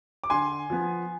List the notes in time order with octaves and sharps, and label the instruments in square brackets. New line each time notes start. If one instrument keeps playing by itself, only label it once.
[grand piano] D6
D3 G#5 C6
F3 B3